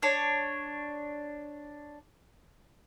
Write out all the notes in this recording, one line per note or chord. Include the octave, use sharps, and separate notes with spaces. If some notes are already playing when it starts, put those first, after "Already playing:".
D4 C#5